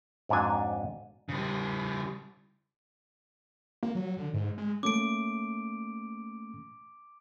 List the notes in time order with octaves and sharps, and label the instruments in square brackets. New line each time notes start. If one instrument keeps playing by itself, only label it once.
[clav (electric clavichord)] F2 G#2 F#3 D4 G#5
[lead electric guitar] C#3 G3
[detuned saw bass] A#3
F#3
D3
G#2
G#3
[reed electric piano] A3 A#3 C#4 [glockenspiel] D6 D7